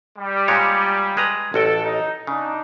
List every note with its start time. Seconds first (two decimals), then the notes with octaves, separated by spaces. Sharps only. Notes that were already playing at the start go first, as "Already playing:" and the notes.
0.18 G3
0.48 A#2 G#3 C#5
1.17 G#3 B4 A#5
1.54 A1 F#4 A4 G5
1.84 D#4
2.27 C#3 D4 D#4